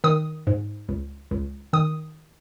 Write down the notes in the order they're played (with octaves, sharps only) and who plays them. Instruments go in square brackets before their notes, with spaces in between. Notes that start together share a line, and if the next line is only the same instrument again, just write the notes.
[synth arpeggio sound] D#3 D#6
G#2
C#2
C#2
D#3 D#6